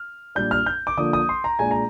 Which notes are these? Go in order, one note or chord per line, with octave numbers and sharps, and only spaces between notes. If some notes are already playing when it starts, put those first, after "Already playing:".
Already playing: F6
A#2 G3 D4 G6
F6
G6
D6
D3 F3 A#3 D4 D#6
D#6
C6
A#5
A#2 G#3 D4 G#5
A#5